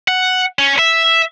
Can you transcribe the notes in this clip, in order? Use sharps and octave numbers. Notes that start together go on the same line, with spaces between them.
F#5
C#4
E5